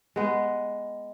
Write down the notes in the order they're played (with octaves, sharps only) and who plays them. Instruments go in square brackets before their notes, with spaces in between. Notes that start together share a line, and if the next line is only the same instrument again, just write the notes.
[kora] G#3 B3